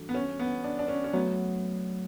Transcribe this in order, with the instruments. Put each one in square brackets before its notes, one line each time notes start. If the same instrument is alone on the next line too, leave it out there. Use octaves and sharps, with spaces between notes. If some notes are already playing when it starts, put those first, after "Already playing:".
Already playing: [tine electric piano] E3 G3 D4 F#4 A4
[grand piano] B3
C#4
B3
D4
D4
C#4
C#4
[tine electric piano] F#3 A3 [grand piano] B3